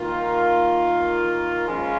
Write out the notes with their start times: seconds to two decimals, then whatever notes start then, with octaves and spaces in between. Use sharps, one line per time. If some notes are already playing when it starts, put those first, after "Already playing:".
Already playing: D#3 A#3 F4
1.67 C#3 F3 G#3 C#4 F4